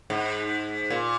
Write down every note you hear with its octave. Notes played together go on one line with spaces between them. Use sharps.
G#2
A#2